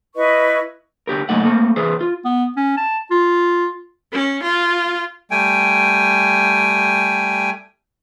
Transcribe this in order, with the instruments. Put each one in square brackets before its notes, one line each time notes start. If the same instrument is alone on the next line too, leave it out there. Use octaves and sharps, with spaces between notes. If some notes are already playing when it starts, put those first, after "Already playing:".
[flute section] E4 B4 D#5 C#6
[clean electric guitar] D3 G4 A#4
C#2 F#2 A3 A#3 D#4 F#5
A3 A#3 C4 A4
E3 G#4 B4 C5
F4
[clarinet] B3
C#4
A5
F4
[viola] C#4
F4
[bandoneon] G3 A3 G5 G#5